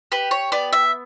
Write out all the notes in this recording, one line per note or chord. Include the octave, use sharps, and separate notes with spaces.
G4 B4
C#5
B3 D5
E5